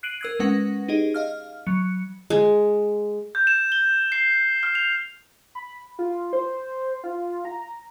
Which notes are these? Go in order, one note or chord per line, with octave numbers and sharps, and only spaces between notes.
F#6 C7 D7 D#7 F#7
A#4 E6 G#6
G#3 C#4 B4 F#5 A#6
D#4 G4 G#4 D#5
D#5 F5 F6
F#3 C#7
G#3
G6
E7
G7
C7
F6
F7
B5
F4
C5
F4
A#5